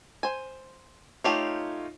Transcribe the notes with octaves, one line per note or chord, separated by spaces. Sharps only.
C5 G#5
A3 D#4 F4 G4 C#5 F5